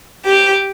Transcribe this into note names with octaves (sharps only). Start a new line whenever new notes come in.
G4